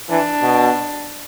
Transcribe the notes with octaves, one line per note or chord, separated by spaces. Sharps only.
E3 D4
B2